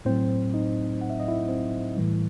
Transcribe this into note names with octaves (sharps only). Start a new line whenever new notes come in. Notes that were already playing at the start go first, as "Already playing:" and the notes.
A2 F#3 C4 C5
D#4 D#5
F#5
E5
D#5
E4 E5
C4 C5
A2 E3 G3